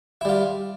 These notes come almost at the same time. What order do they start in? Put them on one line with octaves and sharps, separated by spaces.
E4 G3 F4